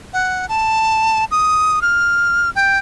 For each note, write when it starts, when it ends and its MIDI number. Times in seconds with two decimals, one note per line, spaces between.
0.13 0.46 78
0.49 1.25 81
1.31 1.80 87
1.82 2.50 89
2.55 2.78 79